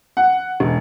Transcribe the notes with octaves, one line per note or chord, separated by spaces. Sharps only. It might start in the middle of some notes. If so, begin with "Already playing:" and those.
F#5
E1